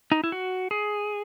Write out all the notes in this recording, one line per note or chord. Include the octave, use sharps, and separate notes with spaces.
D#4
E4
F#4
G#4